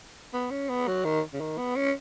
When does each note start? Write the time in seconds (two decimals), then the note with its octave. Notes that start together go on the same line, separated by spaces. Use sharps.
0.33 B3
0.51 C#4
0.69 B3
0.88 F#3
1.05 D#3
1.33 C#3
1.40 D#3
1.58 B3
1.76 C#4